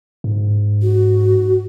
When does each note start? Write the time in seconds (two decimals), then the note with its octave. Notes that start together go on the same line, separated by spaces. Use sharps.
0.24 G#2
0.82 F#4